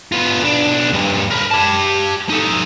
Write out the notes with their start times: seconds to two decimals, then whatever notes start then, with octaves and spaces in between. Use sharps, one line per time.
0.12 B3 F4
0.42 B1 D4
0.94 G2 A#2
1.30 A#4 B4
1.51 G4 A5
2.29 D#4 A4